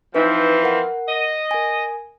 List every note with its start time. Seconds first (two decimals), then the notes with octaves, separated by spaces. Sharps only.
0.15 E3 F3 C4 D#4 B4
0.64 A#4 F#5
1.08 D#5
1.51 A#4 G#5